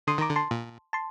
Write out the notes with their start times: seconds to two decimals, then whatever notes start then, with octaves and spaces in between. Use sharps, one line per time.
0.07 D3 C6 D#6
0.18 D#3 A#5 D6
0.30 D3
0.36 A5 C6
0.51 A#2
0.93 A5 C6